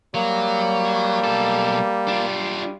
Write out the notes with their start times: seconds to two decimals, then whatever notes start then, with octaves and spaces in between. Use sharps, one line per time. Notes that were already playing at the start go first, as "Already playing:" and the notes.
0.15 F#3 G3 A#3
1.24 B1 A4
2.08 D4 F4